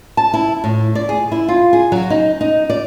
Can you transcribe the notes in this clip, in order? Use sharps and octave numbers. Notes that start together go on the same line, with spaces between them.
A5
E4
A2
D5
G#4
E4
F4
G#4
F#3
D#4
D#4
D5